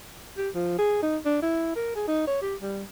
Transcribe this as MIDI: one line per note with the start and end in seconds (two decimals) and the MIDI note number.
0.37 0.49 67
0.54 0.76 53
0.78 0.99 68
1.02 1.17 63
1.25 1.42 62
1.42 1.73 64
1.76 1.92 70
1.96 2.07 68
2.07 2.24 63
2.27 2.41 73
2.42 2.55 67
2.61 2.83 55